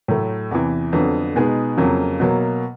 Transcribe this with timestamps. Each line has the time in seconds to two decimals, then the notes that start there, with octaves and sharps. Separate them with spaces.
0.08 A2 F#3 A3
0.51 E2 C3 E3
0.93 F2 D3 F#3 B3
1.36 B2 G#3 B3 D#4 G#4
1.77 F2 C#3 F#3 A#3
2.20 B2 F#3 A#3